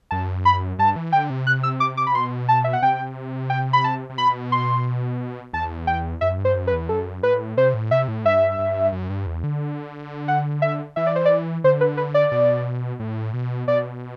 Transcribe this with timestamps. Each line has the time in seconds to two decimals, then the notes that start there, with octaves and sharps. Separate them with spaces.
0.11 F#2 A5
0.45 B5
0.78 G2 A5
0.96 E3
1.12 D3 G5
1.30 C3
1.47 F#6
1.63 E6
1.80 D6
1.97 D6
2.07 B5
2.10 C3
2.15 B2 C6
2.49 A5
2.64 E5
2.73 F#5
2.82 C3 G5
3.50 G5
3.73 B5
3.84 A5
4.10 C3
4.18 B2 B5
4.52 C6
5.53 E2 A5
5.87 G5
6.21 F#2 E5
6.38 G2
6.45 C5
6.55 F#2
6.67 B4
6.73 E2
6.89 F#2 A4
7.23 A2 B4
7.57 C3 C5
7.74 A2
7.91 C3 E5
8.08 A2
8.25 G2 E5
8.59 G2
8.92 F#2
9.10 G2
9.26 E2
9.44 D3
10.28 F#5
10.62 E5
10.96 E3 E5
11.07 D5
11.16 C5
11.26 D5
11.64 D3 C5
11.81 B4
11.97 B4
12.14 D5
12.32 B2
13.00 A2
13.34 B2
13.68 B2 D5